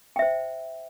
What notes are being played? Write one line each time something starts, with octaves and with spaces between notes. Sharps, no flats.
C5 E5 G5